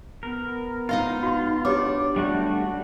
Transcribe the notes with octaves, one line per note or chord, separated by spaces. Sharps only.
B3 A#4
D#4 F4 D#5 F5
F#4 C6
D4 G4 C#5 D6
G3 A3 F#4